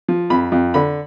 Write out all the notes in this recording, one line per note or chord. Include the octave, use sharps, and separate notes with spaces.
F3
F2 B5
F2
D3 B5